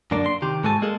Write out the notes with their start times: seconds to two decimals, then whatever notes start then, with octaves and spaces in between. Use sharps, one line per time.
0.11 F#2 D3 A#3 D4
0.26 C6
0.42 C3 D#3 G4
0.64 G#2 G#3 F#4 A4 G#5 A5
0.82 G#3 A#3 G#4 A4